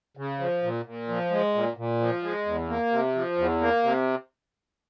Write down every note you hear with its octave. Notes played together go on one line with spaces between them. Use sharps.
C#3
F3
A#2
A#2
F3
G#3
A#2
A#2
F3
G#3
E2
A#3
C3
F3
E2
A#3
C3